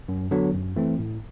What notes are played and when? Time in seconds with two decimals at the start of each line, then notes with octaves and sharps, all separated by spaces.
0.08 F#2
0.31 D3 F#3 B3 D4
0.54 F#2
0.76 E3 A3 C4
0.99 A2